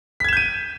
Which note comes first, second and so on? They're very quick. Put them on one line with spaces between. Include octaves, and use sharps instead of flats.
B6 G#6 E7 G6 D#7